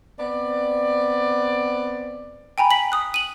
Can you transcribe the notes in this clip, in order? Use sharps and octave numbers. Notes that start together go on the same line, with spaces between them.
B3 C4 D5
G5 G#5 A#5 B5
B6 F#7
D#6 F#6
D#7 F#7